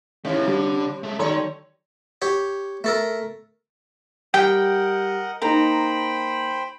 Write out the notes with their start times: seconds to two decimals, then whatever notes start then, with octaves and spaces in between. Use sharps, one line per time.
0.25 C3 D#3 E3 A3
0.47 D3 G3
1.03 G#3 A3
1.19 D#3 F#3 A4 C#5 A#5 C6
2.22 G4 C#5
2.84 A3 A4 A#4
4.34 G3 A#4 D#5 F#5 G5
5.42 A#3 D#4 C5 G5 A#5 B5